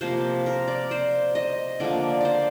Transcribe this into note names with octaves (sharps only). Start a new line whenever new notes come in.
C3 F3 A#3 C5
A#4
D5
C5
D#5
D3 F3 A#3 D5
C5 D5